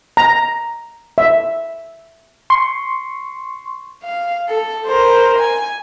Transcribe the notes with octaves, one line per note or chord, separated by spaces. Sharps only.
A#5
E5
C6 C#6
F5
A4
A#4 C5
G#5